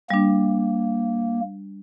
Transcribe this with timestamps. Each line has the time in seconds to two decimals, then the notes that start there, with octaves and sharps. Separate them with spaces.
0.10 G3 A#3 D4